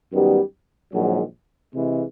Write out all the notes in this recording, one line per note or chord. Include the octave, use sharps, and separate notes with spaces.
F#2 D#3 G3 B3
A#1 G#2 D#3 F#3
C3 E3 G#3